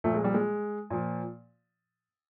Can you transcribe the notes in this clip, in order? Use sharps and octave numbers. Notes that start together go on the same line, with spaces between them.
A#2 F3 A3
G#3
G3
G#3
A#2 F3